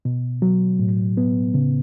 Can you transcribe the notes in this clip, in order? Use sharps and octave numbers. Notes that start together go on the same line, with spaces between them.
B2
F#3
A2
B3
C#3